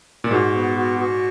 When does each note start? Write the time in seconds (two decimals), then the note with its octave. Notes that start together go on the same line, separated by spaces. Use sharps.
0.24 A#2
0.31 G#2 F#4
0.54 B3
0.76 F#4
0.98 F#4